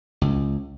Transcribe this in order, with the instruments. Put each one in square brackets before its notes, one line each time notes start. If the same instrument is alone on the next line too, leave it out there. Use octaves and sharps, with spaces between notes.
[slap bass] C#2